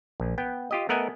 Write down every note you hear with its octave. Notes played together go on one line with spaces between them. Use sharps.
A#1
B3 G5
F4 G4 D#5
A3 B3 A#4 D#5 F#5 G#5